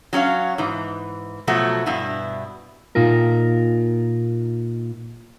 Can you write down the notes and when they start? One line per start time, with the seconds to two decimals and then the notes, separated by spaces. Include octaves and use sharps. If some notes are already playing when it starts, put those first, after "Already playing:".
0.13 F#3 C#4 C#5 F5
0.58 G#2 E3
1.47 B2 F3 F#3 A3 F#4
1.86 G2 B2 E4
2.95 A#2 D#4 F4 A#4